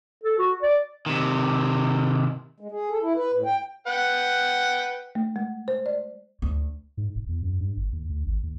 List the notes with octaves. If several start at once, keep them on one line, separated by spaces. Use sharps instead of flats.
A4
F#4
D5
C3 D#3
G#3
G#4
A4
E4
B4
A2
G5
B4 F#5 G5
A3
G#3
C5
D5
D2
G#2
E1
E2
F#2
G2
G1
D#2
D2
G#1
D#2